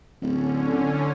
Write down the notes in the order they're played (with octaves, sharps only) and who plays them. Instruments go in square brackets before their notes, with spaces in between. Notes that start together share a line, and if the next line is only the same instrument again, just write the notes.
[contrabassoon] D1 [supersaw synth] D3 C#4